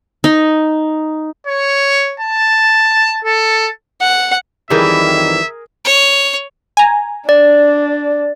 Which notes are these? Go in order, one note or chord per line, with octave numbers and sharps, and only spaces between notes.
D#4
C#5
A5
A4
F#5
F2 D#3 E3 G3 G#4 A#4 E5
C#5
G#5 A#5
D4 D5